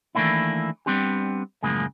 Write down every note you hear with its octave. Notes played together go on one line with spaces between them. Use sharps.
D#3 E3 A3 A#3 D4 E4
G3 B3 C4 D4 G4
F#2 A2 C#3 F3 G#3 A#3